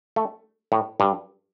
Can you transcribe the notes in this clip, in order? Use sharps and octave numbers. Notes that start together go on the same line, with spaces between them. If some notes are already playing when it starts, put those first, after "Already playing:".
A3
A2
G2